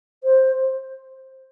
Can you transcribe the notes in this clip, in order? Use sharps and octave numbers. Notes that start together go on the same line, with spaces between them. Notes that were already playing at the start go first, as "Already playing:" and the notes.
C5